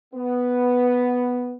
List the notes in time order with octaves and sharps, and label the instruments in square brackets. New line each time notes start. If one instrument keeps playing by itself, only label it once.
[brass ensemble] B3